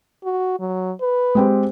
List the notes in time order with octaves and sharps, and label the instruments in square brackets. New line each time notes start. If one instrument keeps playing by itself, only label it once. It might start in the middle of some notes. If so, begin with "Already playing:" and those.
[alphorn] F#4
F#3
B4
[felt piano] G#3 C4 G4